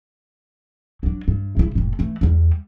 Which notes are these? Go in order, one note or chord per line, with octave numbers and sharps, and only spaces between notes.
F#3 D4
G2
C#3 E4
F1 A2
E3 A3
E2 G3